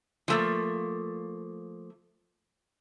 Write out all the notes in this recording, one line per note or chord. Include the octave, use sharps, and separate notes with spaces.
F3 A3 A#3